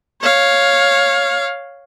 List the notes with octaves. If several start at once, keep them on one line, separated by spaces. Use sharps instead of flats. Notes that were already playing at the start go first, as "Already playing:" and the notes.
C#5 F5